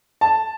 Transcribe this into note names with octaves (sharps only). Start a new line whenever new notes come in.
A5